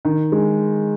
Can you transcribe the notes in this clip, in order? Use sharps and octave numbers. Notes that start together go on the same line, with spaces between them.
D#3
G#3